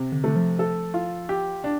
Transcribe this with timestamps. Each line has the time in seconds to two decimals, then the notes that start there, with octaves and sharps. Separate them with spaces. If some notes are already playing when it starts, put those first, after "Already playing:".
Already playing: C3
0.12 D3
0.24 D3 A3
0.36 F3
0.59 A4
0.94 F4
1.29 G4
1.64 D4